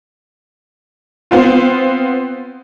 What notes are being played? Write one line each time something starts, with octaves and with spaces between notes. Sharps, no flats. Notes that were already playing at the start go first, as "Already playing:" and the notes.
B3 C4 F4